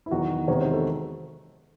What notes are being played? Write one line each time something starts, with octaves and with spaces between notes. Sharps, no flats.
E4
E2 D#3 F#3 F#4
E2 C3 D#3 G#3 C#5
C5
A4